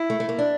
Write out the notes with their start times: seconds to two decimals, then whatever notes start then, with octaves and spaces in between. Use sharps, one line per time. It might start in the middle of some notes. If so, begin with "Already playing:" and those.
Already playing: E4
0.10 A3
0.20 A3
0.29 A#3
0.39 D4